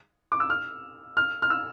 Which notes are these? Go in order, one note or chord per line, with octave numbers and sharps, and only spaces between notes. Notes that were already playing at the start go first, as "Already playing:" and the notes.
D6
E6
F6
F6
F6
E6